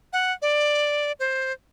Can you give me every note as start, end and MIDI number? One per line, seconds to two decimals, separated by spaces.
0.13 0.32 78
0.42 1.12 74
1.20 1.53 72